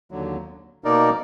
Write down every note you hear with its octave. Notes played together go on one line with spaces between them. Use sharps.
D#2 D3 F#3
B2 A#3 D#4 A#4 D5